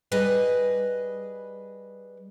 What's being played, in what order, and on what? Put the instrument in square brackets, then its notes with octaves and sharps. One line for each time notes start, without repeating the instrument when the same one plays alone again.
[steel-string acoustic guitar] G3 G#4 B4 D#5